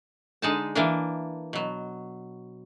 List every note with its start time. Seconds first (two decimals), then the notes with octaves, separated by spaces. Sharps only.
0.42 D3 G#3 D#4 A5
0.75 E3 A#3 D4
1.53 B2 F#3